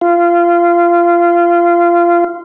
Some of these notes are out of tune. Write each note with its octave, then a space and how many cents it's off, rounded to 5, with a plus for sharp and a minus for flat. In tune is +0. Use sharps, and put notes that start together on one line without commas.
F4 -20